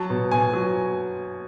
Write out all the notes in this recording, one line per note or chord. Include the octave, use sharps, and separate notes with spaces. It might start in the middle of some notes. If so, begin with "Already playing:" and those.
Already playing: F#3 A5
B2
B2 G#5
F#3